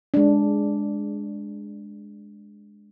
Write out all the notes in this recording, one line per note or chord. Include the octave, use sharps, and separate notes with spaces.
G#3 D4